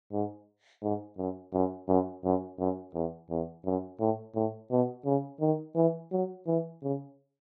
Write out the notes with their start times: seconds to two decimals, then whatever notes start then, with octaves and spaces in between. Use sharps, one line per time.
0.12 G#2
0.83 G#2
1.18 F#2
1.53 F#2
1.88 F#2
2.24 F#2
2.59 F#2
2.94 E2
3.30 E2
3.65 F#2
4.00 A2
4.35 A2
4.71 B2
5.05 C#3
5.41 D#3
5.76 E3
6.12 F#3
6.47 E3
6.82 C#3